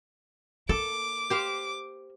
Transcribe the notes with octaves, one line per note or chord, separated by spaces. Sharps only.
A#3 A4 D6
G4 C5 F5